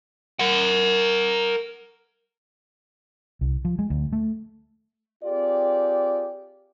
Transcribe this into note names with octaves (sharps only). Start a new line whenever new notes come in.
A#4 F#5
C2
F3
G#3
D2
A3
C4 F4 G4 G#4 D5